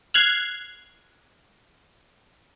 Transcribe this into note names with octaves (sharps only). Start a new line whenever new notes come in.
F6 F#6 G#6 C7